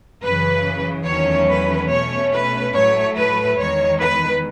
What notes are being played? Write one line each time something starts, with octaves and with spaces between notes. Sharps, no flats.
F#2 C#3 E3 B4
E2 D#3 F#3 A3 C#4 C#5
B4
B2 A3 C#4 C#5
B4
A2 F#3 A3 C#5
B4
E2 D#3 G#3 C#5
B4